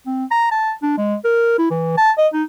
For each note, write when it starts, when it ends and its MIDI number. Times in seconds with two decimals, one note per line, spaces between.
0.07 0.25 60
0.31 0.49 82
0.51 0.72 81
0.83 0.95 62
0.98 1.15 56
1.25 1.56 70
1.58 1.69 64
1.71 1.93 52
1.97 2.11 81
2.18 2.28 75
2.34 2.43 63